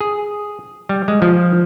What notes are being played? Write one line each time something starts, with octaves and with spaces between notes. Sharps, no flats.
G#4
G3
G#3
F3